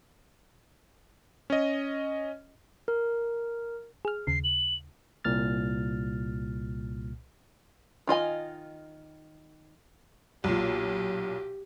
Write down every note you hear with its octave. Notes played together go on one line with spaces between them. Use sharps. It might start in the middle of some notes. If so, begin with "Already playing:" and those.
C#4 D#5
A#4
G#4 F6
D#2 C#3 C7
F#7
C2 A#2 F6 A6
D#3 F4 D#5 G#5
B1 A#2 G4